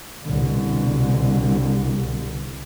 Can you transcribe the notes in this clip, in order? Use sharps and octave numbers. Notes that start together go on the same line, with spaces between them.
C2 B2 D3